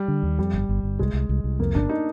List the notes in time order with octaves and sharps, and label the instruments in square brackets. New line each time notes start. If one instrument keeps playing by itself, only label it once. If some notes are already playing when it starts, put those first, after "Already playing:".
Already playing: [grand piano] G3
[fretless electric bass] D3
D#2
[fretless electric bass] F2 [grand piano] G3
[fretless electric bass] G1
G1
G1
[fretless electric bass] C2 [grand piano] G#3
[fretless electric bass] C2
C2
C2
[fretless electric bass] F2 [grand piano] A#3
[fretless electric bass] G1 [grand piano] D4
[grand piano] D#4